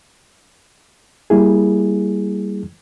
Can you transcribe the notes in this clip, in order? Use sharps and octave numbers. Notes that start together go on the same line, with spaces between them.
G3 A#3 E4 G#4